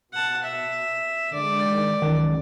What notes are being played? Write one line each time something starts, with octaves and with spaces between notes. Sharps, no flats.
B2 F#5 A5
E5
D3 G#3 D5
D#3
C#2 F#2 D#3 E3